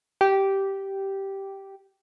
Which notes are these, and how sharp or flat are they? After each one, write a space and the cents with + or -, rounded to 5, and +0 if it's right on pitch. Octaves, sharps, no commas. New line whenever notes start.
G4 -10